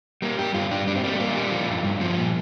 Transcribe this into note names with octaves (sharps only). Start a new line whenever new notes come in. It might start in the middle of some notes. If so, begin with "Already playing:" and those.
G3 A#3
G2 G4
G2 F4
G3 D4
G3 D4
C4
G3 A#3
A3
A#2 A#3
G3
F3
G2
G2
F3
A#2